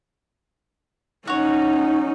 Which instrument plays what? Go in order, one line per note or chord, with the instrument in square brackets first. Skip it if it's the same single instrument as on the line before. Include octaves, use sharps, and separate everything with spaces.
[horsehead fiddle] C#4 D#4 [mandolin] F#4 C#5